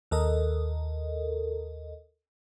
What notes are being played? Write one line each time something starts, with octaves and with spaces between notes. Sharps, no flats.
D#2 A4 A#4 D#5